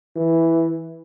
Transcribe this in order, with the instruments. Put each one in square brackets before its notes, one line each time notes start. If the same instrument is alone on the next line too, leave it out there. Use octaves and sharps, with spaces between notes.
[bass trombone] E3